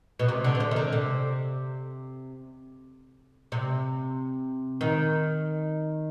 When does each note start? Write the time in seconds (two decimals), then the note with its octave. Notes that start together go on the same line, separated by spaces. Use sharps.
0.19 B2
0.28 C3
0.44 D3
0.55 B2
0.60 C3
0.71 D#3
0.76 D3
0.92 C3
3.52 C3
4.81 D#3